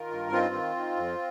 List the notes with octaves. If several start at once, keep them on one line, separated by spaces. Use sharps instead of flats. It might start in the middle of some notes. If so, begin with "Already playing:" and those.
Already playing: D#3 F4 A#4
G2
D#3 C4 F4
D#3
D#3
F2